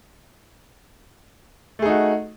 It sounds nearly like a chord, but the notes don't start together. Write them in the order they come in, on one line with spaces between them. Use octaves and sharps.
A3 G#4 D#4 F#4